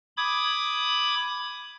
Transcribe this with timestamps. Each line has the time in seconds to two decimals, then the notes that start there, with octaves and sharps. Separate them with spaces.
0.17 B5 D6 D#6 G#6